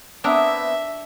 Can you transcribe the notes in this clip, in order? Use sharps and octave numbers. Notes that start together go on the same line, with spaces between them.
B3 C4 D4 E4 A#4 E5